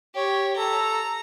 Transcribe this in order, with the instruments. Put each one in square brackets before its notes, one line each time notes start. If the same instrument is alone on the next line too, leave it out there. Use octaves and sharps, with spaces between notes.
[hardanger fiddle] G4 [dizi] C#5
[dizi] A4 [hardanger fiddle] A#5